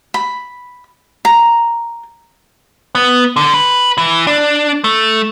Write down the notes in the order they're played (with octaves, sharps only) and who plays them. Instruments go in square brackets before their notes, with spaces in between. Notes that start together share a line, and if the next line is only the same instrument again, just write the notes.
[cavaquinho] B5
A#5
[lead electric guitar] B3
D3
B4
E3
D4
A3